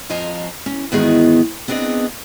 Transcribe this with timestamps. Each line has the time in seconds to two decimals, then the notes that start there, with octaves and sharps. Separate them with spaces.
0.09 F2 F3 D#5 G#5 A#5
0.66 C#4
0.92 E2 G#2 D#3 B3 F#4 G#4
1.68 B3 C4 D4 G#4 D#5